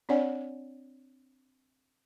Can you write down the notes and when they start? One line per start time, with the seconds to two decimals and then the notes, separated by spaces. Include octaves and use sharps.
0.09 C4 D4 C#5 D5 F#5 G#5